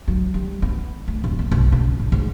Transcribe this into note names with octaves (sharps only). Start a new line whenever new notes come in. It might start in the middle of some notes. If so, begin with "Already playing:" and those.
F#3
G3
B3
A3
D1
A#3
B1
C#2
A2
G#2